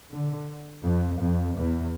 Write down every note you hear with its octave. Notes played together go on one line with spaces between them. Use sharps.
D3
F2
F2
E2